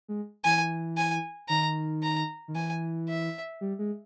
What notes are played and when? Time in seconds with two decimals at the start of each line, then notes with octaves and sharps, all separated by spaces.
0.09 G#3
0.44 E3 G#5
0.97 G#5
1.49 D#3 A#5
2.03 A#5
2.48 D#3
2.55 E3 G#5
3.09 E5
3.61 G3
3.79 G#3